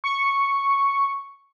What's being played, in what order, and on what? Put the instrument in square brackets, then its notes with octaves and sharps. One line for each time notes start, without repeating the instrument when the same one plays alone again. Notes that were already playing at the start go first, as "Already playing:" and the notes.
[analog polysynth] C#6